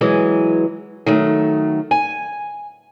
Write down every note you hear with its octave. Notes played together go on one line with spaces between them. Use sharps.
E3 F#3 G#3
D#3 F#3 A3
G#5